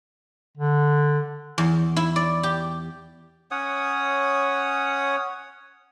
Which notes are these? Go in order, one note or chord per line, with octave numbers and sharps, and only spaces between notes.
D3
E2
E4
D5
G4
C#4 C#5 F#5 D#6